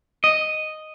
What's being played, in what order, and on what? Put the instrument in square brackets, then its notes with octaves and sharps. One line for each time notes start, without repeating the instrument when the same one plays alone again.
[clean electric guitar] D#5